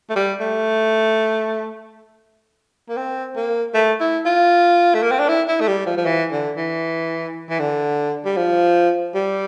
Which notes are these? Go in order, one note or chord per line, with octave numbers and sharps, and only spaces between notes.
A3
G3
A3
A#3
C4
A#3
A3
E4
F4
A3
A#3
C4
D4
E4
E4
A3
G3
F3
F3
E3
D3
E3
E3
D3
G3
F3
G3